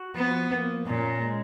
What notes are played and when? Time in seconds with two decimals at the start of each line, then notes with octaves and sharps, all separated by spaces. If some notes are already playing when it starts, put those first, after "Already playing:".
Already playing: F#4
0.15 F3 B3
0.50 A#3
0.86 A#2 C#4
1.21 G#3